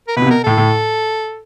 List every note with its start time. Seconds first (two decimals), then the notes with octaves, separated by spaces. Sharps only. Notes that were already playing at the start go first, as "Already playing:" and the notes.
0.08 A#4
0.16 B2 B4
0.22 C3
0.27 B2
0.31 A#4
0.44 A2 A4
0.58 A2